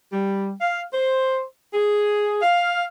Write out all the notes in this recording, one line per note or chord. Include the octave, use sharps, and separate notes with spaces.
G3
F5
C5
G#4
F5